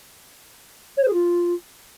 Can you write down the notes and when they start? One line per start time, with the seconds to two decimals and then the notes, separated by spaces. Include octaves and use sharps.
0.97 C#5
1.02 C5
1.07 G#4
1.13 F4